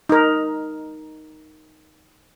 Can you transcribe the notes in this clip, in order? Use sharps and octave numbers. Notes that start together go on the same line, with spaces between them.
D#4 A#4